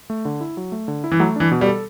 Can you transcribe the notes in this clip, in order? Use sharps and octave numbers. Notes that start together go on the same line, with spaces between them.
A3
D3
E4
F#3
A3
D3
E4
E3
F#3 A3
E3 D4
B2
G3
A4